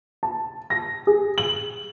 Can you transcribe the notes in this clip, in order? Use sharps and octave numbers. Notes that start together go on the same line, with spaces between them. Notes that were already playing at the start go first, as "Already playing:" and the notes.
A5
A#6
G#4
F#7